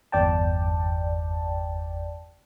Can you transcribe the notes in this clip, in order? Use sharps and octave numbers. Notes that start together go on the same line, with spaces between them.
G1 E2 D5 G5 A5